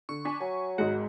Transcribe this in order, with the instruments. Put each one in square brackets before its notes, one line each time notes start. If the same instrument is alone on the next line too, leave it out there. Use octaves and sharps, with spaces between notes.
[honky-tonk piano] D3 [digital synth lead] C#6
[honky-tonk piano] D4 G#5 B6
[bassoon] F#3 [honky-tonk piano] G#5
[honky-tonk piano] G#1 G#2 C#7 [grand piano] G#3 [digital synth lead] F#4